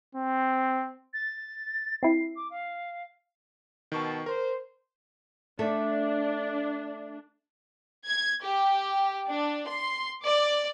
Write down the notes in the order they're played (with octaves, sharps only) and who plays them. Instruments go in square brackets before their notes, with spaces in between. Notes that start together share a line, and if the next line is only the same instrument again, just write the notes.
[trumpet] C4
[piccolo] A6
[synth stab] C4 E4 [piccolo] C7
[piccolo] D6
F5
[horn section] B2 A5 [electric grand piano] D#3 C#6
[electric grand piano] A#4 [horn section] C5
[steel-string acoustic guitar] A3 [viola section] D4
[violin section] G#6
G4
D4
C6
D5